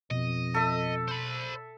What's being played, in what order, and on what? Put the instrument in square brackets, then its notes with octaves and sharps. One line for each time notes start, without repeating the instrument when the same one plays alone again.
[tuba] F2 [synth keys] B2 [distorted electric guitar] D#5
[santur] A4 E5
[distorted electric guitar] C5 B5